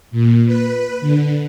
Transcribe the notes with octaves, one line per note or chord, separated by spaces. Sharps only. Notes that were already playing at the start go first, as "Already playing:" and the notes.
A#2
B4
D3